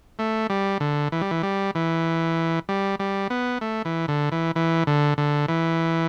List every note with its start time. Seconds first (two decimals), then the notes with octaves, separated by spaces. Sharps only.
0.19 A3
0.50 G3
0.80 D3
1.12 E3
1.21 G3
1.31 E3
1.43 G3
1.75 E3
2.69 G3
3.00 G3
3.30 B3
3.61 A3
3.85 E3
4.08 D3
4.32 E3
4.56 E3
4.87 D3
5.18 D3
5.48 E3